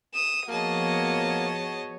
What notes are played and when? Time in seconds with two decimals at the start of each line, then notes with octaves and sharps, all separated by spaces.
0.14 D#6 E7
0.49 F3 A#3 B3 F#4 G#4 C#5 D#5 A5